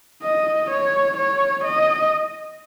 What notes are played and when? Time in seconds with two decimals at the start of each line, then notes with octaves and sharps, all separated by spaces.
0.23 D#5
0.71 C#5
1.17 C#5
1.64 D#5